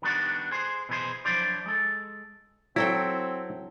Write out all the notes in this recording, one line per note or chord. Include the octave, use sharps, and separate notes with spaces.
D#3 G3 B3 D4 F#4
G#4 C5
B2 E3 G#4 C5
F3 F#3 D4 E4 C5 D5
G#3 A4
F#3 C4 E4 A4 G5